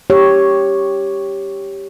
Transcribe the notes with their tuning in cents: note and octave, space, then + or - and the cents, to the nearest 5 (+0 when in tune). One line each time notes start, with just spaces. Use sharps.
G4 +0 C#5 +0